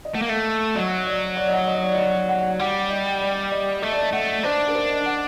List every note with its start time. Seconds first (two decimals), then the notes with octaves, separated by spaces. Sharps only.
0.05 D#5
0.14 A3 F#5
0.22 A#3
0.29 A3
0.75 F#3 D#5
1.06 D5
1.36 D5
1.48 D#5
1.52 F#5
1.68 D#5
1.83 D5
1.93 D#5
1.98 D5
2.29 F#5
2.60 G3 F#5
2.90 D#5
3.21 D5
3.52 D#5
3.82 A3 D#5
3.92 D5
4.02 D#5
4.13 A3 F#5
4.43 D4 C5
4.59 D5
4.68 A#4
4.75 C5
4.89 D#5
5.06 F#5